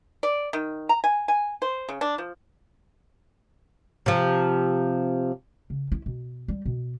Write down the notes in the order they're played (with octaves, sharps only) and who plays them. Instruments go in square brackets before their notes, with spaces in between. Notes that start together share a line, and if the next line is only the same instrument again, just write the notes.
[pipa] D5
D#3
A#5
G#5
G#5
C5
C#3
D4
F3
[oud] C3 F3
[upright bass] C#3
E4
B2
G3
B2